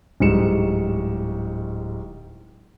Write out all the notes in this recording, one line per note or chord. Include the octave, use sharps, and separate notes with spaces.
D1 G#2 G3 C#7 E7